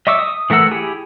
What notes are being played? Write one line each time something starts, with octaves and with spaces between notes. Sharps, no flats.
D#5 E5 C#6 D6 E6
D#6
E3 A3 A#4 F#5 E6
E4 G4 G#4